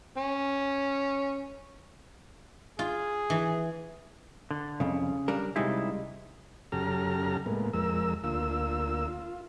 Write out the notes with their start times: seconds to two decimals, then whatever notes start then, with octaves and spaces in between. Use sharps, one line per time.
0.17 C#4
2.79 F4 G#4
3.30 E3
4.51 D3
4.80 C2 F2 C#3
5.28 G3 D4 A#4
5.56 C#2 C3 G3 G#3 D#4 E4
6.72 F#2 C#3 G4 A4 A#5 F6
7.46 A2 G#3 A#3 B3
7.73 F2 G#3 A#4 E6
8.24 D2 A#3 F4 E6
9.08 F4